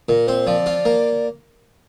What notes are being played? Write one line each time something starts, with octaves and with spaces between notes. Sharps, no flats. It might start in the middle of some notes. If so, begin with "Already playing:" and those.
A#2 A#4
C4 C5
F3 D5
F4
A#3